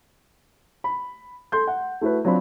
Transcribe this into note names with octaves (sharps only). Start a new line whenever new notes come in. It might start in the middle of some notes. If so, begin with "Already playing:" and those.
B5
A4 C6 G6
F#5
A3 E4 F#4 A4 B4
F#3 C4 D4 F4 C5 B5